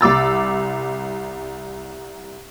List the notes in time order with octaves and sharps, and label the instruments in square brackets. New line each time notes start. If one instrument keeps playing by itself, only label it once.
[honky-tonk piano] C2 D6 E6 A6